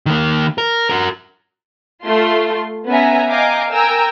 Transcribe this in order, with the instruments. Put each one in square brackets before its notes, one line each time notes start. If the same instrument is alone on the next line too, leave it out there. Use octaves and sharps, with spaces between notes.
[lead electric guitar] D#3 A#3
A#4
F#4 A#4
[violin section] A3 F4 C6
B3 C#4 E5 G#5 A#5
D#5 F5 G5 G#5 A#5 D6
A#4 G5 G#5 A#5 E6